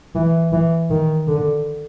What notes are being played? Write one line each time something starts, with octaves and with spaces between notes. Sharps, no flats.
E3
E3
D#3
D3